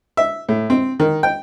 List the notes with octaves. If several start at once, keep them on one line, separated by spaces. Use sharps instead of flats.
E5
A2
C4
D#3
G5